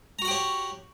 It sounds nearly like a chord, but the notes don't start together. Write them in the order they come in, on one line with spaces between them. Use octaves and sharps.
A#5 F#4 F#5 G4 C#5